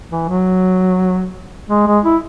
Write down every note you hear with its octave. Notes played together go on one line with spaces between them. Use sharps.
E3
F#3
G#3
G#3
E4